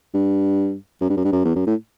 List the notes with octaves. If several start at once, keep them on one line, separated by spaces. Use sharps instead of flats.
G2
F#2
G2
F#2
G2
F#2
E2
F#2
A2